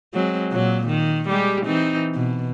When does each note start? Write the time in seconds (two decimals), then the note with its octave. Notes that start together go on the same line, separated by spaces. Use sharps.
0.14 F#3 G#3 C4
0.52 A#2 F#3
0.87 D#3
1.29 G3 G#3 G4
1.65 E3 C4 D#4
2.14 B2